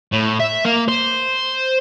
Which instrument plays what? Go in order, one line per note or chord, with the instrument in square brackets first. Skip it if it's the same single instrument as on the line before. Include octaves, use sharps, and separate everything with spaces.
[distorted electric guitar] A2
E5
A#3
C5